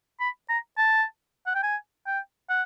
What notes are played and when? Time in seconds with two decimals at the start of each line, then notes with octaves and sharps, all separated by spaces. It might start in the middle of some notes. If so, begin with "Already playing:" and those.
0.20 B5
0.49 A#5
0.77 A5
1.47 F#5
1.55 G5
1.63 G#5
2.06 G5
2.49 F#5